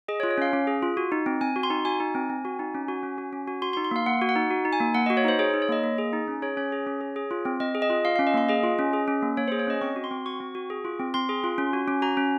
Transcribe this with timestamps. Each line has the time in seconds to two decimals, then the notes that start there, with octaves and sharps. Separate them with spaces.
0.08 G#4 D#5
0.20 C#5
0.23 F4
0.31 C#5
0.38 C#4 F5
0.53 C#4
0.67 G#4
0.82 F4
0.97 F#4
1.12 D#4
1.26 C4
1.41 C4 G#5
1.56 F#4
1.63 C6
1.70 D#4
1.85 F#4 G#5
2.00 D#4
2.15 C4
2.30 C4
2.45 F#4
2.59 D#4
2.74 C#4
2.88 F#4
3.03 C#4
3.18 F#4
3.33 C#4
3.48 F#4
3.62 F#4 C6
3.73 C6
3.77 D#4
3.84 C6
3.91 A#3 F5
4.06 A#3 F#5
4.22 F#4
4.29 F#5
4.36 D#4
4.50 F#4
4.65 D#4
4.73 G#5
4.80 A#3
4.95 A#3 F#5
5.06 F#4 D#5
5.17 C#5
5.24 D#4 C5
5.39 G#4 C#5
5.50 C#5
5.54 D#4
5.62 C#5
5.69 A#3 D#5
5.84 A#3
5.98 G#4
6.13 D#4
6.28 C#4
6.42 G#4 C#5
6.57 C#4 C#5
6.72 G#4
6.87 C#4
7.01 G#4
7.16 G#4
7.31 F4
7.45 C4
7.60 C4 D#5
7.75 G#4
7.82 D#5
7.90 F4
8.05 F4 F5
8.16 C#4 F5
8.27 D#5
8.34 A#3 F5
8.49 G#4 D#5
8.63 F4
8.79 C#4
8.93 G#4
9.08 C#4
9.23 A#3
9.37 A#3 C#5
9.48 G#4 C5
9.59 C#5
9.67 C#4 D#5
9.81 C4 C#6
9.96 F#4
10.04 C6
10.11 C4
10.26 F#4 C#6
10.40 C4
10.55 F#4
10.70 G#4
10.85 F4
11.00 C4
11.14 C4 C6
11.29 G#4
11.44 F4
11.58 C#4
11.73 F#4
11.88 C#4
12.02 F#4 A#5
12.17 C#4